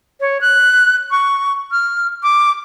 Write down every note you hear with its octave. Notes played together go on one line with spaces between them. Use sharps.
C#5
F#6
C#6
F6
D6